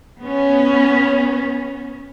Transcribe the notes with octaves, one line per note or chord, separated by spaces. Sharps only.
B3 C#4